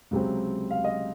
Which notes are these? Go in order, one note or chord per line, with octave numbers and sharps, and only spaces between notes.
C#2 C3 F#3 C4
F5
D#5